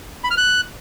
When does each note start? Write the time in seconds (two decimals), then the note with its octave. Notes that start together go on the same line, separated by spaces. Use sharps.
0.24 B5
0.31 F6
0.37 F#6